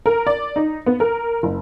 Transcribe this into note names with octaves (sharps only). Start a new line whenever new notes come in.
A#4
D5
D#4
B3
A#4
F#1